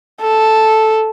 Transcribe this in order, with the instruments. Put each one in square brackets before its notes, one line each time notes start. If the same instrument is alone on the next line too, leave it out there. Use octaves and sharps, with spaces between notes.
[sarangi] A4